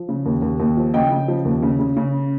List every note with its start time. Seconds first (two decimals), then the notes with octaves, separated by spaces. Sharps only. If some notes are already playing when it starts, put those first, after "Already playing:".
Already playing: F3
0.09 C#3
0.26 D#2
0.42 D#2
0.60 D#2
0.77 F3
0.94 C#3 D#5 G5
1.11 C#3
1.28 F3
1.45 D#2
1.63 C#3
1.79 C#3
1.97 C#3